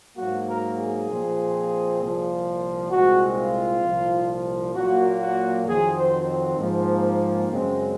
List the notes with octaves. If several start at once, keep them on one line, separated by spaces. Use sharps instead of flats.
G#2 F#3 A#3 F#4
A#4
G#4
A#2 F3 C4
C2 A#2 F3
C2 A#2 G#3 C4 F#4
F4
C2 A#2 F3
A#2 F#3 A#3 F#4
F#4
F2 D#3 F#3 C4 G#4
C5
G#2 F3 A#3
F#2 C#3 G#3 C4